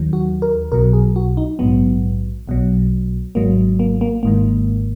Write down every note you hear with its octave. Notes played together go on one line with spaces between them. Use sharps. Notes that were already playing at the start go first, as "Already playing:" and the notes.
Already playing: D#2 D#3 F#3
F#4
A#4
B1 B2 F#3 A#4
G#4
F#4
D#4
A#1 G#2 F#3 B3
B1 B2 F#3
G#1 G#2 F#3 A#3
A#3
A#3
G#1 G#2 D#3 A#3